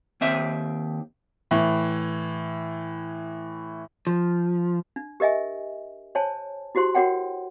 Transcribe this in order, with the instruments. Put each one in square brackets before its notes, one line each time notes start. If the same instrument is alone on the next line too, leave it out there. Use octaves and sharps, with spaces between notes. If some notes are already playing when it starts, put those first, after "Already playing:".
[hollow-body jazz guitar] D#2 C4 E5
[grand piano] A2 E3
[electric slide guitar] F3
[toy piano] D4
G4 A#4 D#5 E5 G#5
C5 C#5 G#5 A5
E4 F#4 G4 C5 C6
F#4 A#4 C#5 F#5 G5